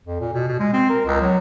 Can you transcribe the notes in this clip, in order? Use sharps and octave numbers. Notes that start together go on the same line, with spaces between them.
F2
A#2
B2
B2
G#3
C4
A#4
C#2
F#3